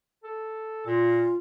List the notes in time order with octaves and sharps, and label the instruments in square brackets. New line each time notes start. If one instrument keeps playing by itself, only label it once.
[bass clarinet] A4
[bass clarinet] A#2 [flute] F4